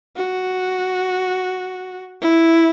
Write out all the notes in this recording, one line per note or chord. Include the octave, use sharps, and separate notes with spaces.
F#4
E4